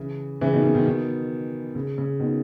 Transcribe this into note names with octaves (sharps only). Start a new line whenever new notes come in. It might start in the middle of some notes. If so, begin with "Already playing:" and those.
Already playing: C#3 E3
C#3 E3
B2 D#3
C#3
B2 D#3
B2 D#3
C#3
C#3
B2 D#3